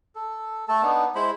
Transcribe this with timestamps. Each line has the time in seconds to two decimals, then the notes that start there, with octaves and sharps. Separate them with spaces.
0.15 A4
0.68 A3 A4 A5
0.82 B3 D4 D#4
1.15 G#3 E4 C5 B5